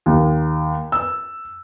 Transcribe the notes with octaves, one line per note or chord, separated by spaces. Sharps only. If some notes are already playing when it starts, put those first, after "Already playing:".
D#2
E6